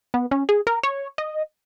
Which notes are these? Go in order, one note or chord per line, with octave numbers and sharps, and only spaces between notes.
B3
C#4
G#4
A#4
C#5
D#5